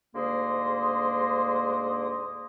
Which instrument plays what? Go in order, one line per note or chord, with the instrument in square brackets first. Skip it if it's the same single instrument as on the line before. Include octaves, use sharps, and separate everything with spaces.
[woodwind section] D2 G#2 D3 A#3 D#5 C6